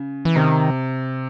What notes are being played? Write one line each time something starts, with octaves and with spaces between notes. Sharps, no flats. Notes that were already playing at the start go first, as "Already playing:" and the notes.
Already playing: C#3
E3
C3 D#3